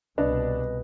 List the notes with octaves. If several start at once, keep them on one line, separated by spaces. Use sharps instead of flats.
C2 B2 D4 B4 D#5